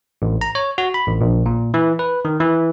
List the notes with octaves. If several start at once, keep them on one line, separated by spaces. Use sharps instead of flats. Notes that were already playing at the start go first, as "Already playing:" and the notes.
A1
A#5
C#5
F#4
B5
A1
A#1
A#2
E3
B4
D#3
E3